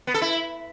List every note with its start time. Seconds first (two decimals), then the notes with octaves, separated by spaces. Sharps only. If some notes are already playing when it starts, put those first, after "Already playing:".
0.07 B3
0.14 A4
0.22 E4